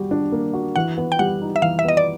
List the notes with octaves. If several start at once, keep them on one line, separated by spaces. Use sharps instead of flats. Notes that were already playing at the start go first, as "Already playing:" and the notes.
Already playing: G3 F#4
D4
A#3
F#4
E3 F#5
B3
G5
G3 F#5
D#4
E5
E3 F5
E5
B3 D#5
D5